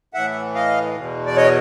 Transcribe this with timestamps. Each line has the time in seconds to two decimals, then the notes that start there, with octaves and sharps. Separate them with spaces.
0.14 A2 E3 E5 F#5
0.55 D#5 F5
0.96 E2 B2
1.26 D5
1.36 C#5 D#5